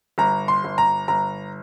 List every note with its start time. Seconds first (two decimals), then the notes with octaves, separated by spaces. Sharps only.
0.18 G1 A#5
0.48 C6
0.64 G1
0.78 A#5
1.08 G1 A#5